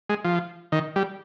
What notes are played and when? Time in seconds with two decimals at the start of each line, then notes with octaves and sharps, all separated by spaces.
0.09 G#3
0.25 F3
0.72 D#3
0.96 G3